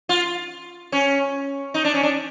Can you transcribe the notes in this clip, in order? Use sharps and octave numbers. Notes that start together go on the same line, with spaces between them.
F4
C#4
D#4
D4
C#4
D4